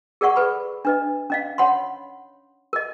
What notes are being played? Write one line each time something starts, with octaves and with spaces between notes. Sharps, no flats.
G#4 A#4 D5 F#5 C#6
A4 B4 B5
D4 B4 D#5
C#4 D#5 F5
C#5 F#5 B5 C6
A#4 D#5